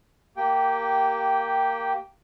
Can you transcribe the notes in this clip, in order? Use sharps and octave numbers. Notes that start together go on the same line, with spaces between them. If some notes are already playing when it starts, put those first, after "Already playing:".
A#3 G4 G5